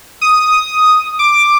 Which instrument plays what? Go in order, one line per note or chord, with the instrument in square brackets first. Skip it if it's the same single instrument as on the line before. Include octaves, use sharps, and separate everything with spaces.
[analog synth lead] D#6
D6